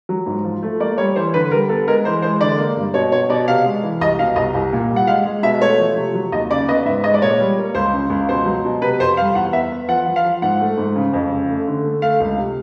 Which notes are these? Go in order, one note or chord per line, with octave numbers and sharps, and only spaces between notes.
F#3
G#2
F3
A3
A#3 D5
G3 C#5
E3 C5
D3 B4
G3 A#4
B3 A4
G#3 A#4
E3 C5
G#3 C5
D3 D5
A#3
G2
B2 C#5
B2 C#5
B2 D5
C3 F5
G#3
E3
C2 D#5
B2 F5
C2 D#5
C2
A#2
G3
F#5
G#3 F5
G#3
B2 E5
A3 C#5
F3
C3
F#3
D#2 D#5
C#3 D5
B3 D#5
G#2 E5
G#3 D#5
D5
A#2 C#5
G3
A#3
C#2 C5
C#3
C#2
B2 C5
F#3
B2
C3 B4
F2 C5
G3 F5
E2 F#5
B3 E5
B3
F3 F#5
F3
F5
F3
G#2 F#5
A3
G#2
C#3
F2
C#3
A3
D3
A3
A3 F5
C#2
C3